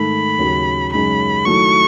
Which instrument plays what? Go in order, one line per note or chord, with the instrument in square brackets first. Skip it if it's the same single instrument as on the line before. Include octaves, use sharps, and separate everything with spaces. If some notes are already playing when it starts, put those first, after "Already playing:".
Already playing: [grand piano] G#2 D#3 A3 [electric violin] B5
[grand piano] D#2 C#3 F#3
[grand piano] F#2 C#3 G#3 D#4 G#4 [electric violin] B5
[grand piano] D#3 F#3 A3 E4 [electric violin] C#6